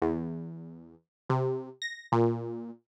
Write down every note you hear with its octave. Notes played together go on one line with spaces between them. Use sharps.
E2
C3
A#6
A#2